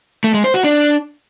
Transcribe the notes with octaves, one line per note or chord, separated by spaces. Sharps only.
A3
G#3
C5
F#4
D4